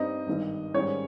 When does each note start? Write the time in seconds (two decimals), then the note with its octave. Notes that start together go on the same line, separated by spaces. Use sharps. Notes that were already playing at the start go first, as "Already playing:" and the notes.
Already playing: G2 G3 C4 D#4 D#5
0.27 G#1 G2 D#3
0.74 G#2 D#3 G3 C#4 C#5